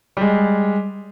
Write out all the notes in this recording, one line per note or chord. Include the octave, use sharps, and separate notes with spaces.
G3 G#3